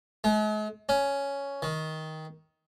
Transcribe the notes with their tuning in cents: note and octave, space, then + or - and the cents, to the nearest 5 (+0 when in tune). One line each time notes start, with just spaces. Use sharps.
G#3 +45
C#4 +5
D#3 +15